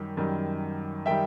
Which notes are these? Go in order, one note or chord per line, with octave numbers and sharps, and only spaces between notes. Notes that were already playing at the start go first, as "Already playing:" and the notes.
Already playing: F#2 D#3 G3
F#2 D#3 G3
D#3 G3 E5 G5